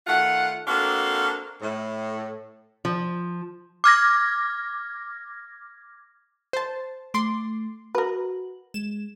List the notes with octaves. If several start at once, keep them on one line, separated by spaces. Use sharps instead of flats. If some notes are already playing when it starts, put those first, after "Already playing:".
D#3 A3 F4 F#5
A#3 C4 D4 F#4 A4 F5
A2
F3
D6 F6 G#6 A#6
C5 A5
A3 C6 D6
F#4 A#4 B4
G#3 E7